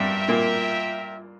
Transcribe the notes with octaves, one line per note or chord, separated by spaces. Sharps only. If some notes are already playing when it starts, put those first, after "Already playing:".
Already playing: G2 G3 F4 A#4 E5 G5
A#2 A#3